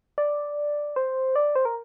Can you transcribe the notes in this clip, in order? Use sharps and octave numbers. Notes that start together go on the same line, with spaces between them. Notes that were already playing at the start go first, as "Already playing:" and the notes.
D5
C5
D5
C5
A#4